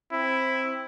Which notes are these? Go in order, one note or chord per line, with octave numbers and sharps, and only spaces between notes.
C4 E4